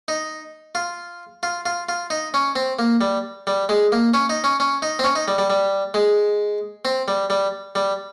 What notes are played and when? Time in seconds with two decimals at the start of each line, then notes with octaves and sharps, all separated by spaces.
0.08 D#4
0.75 F4
1.43 F4
1.66 F4
1.89 F4
2.10 D#4
2.34 C#4
2.56 C4
2.79 A#3
3.01 G3
3.47 G3
3.69 G#3
3.92 A#3
4.14 C#4
4.30 D#4
4.44 C#4
4.60 C#4
4.82 D#4
4.99 C4
5.04 C#4
5.15 D#4
5.28 G3
5.38 G3
5.50 G3
5.94 G#3
6.85 C4
7.08 G3
7.30 G3
7.75 G3